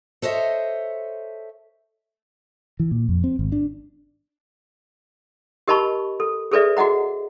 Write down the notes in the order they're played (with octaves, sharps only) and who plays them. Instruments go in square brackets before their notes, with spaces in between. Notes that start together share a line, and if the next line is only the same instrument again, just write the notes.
[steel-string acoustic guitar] A4 C5 C#5 D#5 E5
[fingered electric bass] E3
A#2
F2
C4
G#1
D4
[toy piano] G4 A#4 D#5 A5 B5 C#6
A4
G#4 A4 B4 D5 E5
F#4 G#4 D#5 F#5 A#5